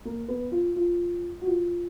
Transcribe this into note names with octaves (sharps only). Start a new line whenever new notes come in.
A#3
B3
F4
F4
F#4
F4